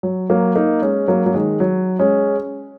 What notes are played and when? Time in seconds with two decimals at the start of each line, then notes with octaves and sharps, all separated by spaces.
0.03 F#3
0.30 F#3 A#3
0.56 A#3 D#4
0.82 G#3 C#4
1.08 F#3 A#3
1.26 F#3
1.34 D#3 G#3
1.60 F#3
1.99 G#3 C#4